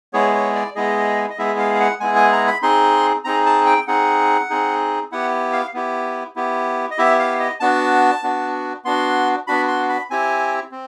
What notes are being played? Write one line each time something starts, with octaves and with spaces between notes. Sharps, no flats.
G#3 B3 E4 G#4 C#5
C#5
D5
G#3 B3 E4 G#4 D#5
D#5
G#3 B3 E4 G#4 E5
F5
F5
F#5
G#3 B3 E4 G#4 G#5
G#5
A#5
B5
C4 D#4 G#4 C6
C4 D#4 G#4 A#5
A5
G5
C4 D#4 G#4 F#5
C4 D#4 G#4
B3 E4 G4 F#5
F5
B3 E4 G4
B3 E4 G4
D#5
B3 E4 G4 E5
F5
D#5
B3 D4 F#4 A5
B3 D4 F#4
B3 D4 F#4 C6
B3 D4 F#4 B5
C6
B5
C4 E4 G4 G#5
C4